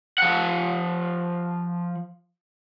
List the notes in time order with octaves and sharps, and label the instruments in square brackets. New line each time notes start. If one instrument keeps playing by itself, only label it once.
[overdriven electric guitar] F3 F#5